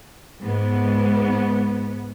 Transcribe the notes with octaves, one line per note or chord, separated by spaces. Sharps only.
G#2 B3